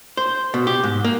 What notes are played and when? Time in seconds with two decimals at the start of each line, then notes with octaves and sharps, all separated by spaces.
0.17 C5
0.54 B2
0.67 G4
0.84 G#2
1.05 A#3